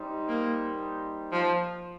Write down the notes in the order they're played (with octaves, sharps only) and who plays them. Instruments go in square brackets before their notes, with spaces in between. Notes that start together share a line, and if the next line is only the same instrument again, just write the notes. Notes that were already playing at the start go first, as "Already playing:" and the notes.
Already playing: [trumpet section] G3 D#4 C5
[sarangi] A#3
F3